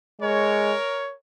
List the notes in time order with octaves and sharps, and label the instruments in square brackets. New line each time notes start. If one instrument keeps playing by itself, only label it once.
[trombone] G#3 [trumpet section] A#4 C#5